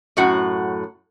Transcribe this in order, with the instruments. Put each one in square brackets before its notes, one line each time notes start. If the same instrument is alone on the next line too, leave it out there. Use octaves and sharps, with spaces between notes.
[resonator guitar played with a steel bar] F#2 A2 F#4 F#5